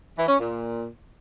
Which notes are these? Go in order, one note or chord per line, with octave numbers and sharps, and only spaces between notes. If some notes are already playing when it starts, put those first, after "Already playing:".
E3
C#4
A#2